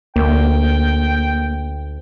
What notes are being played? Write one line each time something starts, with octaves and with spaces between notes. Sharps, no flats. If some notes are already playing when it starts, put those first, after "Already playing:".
D2 A#3 G5